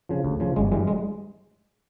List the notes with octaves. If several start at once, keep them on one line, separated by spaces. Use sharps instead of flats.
C#3 F3
D2
C#3 F3
G1 G#3
G2 E3 G3 G#3
G#3